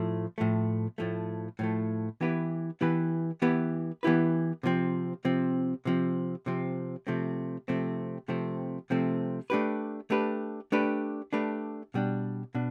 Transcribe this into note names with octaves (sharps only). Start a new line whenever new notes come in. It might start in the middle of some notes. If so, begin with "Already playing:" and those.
Already playing: A2 F3 A3
A2 F3 A3
A2 F3 A3
A2 F3 A3
E3 B3 E4 G4 B4
E3 B3 E4 G4 B4
E3 B3 E4 G4 B4
E3 B3 E4 G4 B4
C3 F3 C4
C3 F3 C4
C3 F3 C4
C3 F3 C4
C3 F3 A3 C4
C3 F3 A3 C4
C3 F3 A3 C4
C3 F3 A3 C4
A3 D4 G4 B4
A3 D4 G4 B4
A3 D4 G4 B4
A3 D4 G4 B4
B2 G3 D4
B2 D4